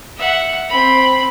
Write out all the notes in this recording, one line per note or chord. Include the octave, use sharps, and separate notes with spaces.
E5 F#5
C4 B5